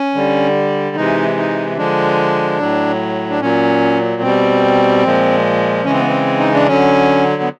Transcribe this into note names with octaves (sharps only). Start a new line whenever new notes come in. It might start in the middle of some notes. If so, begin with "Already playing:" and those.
Already playing: C#4
D3 G3
C3 E3 G#3 D#4
D#4
D3 F3 G#3 D4
A2 F#3
D4
A#2 F#3 C#4
B2 G3 C4
A#2 F3 G#3
C#3 E3 G#3 C#4
C4
B3
C4
D#4
D4
D3 F#3 C#4
B3